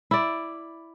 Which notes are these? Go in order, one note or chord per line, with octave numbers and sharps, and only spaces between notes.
E4 D5